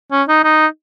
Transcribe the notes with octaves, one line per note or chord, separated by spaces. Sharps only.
C#4
D#4
D#4